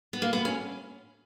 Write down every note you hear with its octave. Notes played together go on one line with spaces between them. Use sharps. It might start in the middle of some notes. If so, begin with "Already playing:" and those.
B3
A#3
B3
C#4